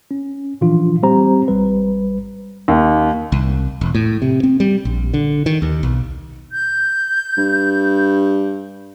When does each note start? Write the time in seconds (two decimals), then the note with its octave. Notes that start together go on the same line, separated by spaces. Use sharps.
0.11 C#4
0.61 A#2 E3 F3 D4 F4
1.03 G3 C4 G4 C5 A#5
1.48 A1 G3 B4
2.68 D#2
3.32 C2
3.81 E1
3.95 A2
4.22 C3
4.43 C4
4.60 G3
4.85 A#1
5.14 D3
5.46 D#3
5.62 D#2
5.83 B1
6.52 G6
7.37 G2